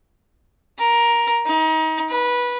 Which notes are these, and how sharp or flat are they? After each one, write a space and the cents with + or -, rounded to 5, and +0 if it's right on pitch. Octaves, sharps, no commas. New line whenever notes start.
A#4 +10
D#4 +30
B4 -15